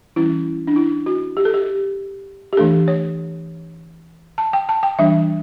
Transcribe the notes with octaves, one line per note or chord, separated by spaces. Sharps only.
E3 G3 C#4 E4
D4
E4
F#4
G4
A4
G4
G4
E3 A3 D4 A4
C#5
A5
G5
A5
G5
E3 G3 D4 E5